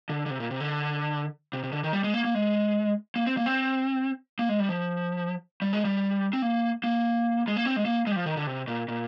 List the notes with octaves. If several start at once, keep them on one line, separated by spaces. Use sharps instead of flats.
D3
D3
C3
A#2
C3
D3
C3
C3
D3
D#3
G3
G#3
A#3
A#3
G#3
A#3
C4
A#3
C4
A#3
G#3
G3
F3
G3
G#3
G3
C4
A#3
A#3
G#3
A#3
C4
G#3
A#3
G#3
G3
F3
D#3
D3
C3
A#2
A#2